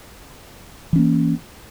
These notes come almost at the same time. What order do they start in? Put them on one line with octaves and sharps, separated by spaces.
E3 C#4 A#3